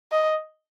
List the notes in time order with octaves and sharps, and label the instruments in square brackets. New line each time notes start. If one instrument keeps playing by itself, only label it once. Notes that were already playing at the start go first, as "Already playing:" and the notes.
[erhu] D#5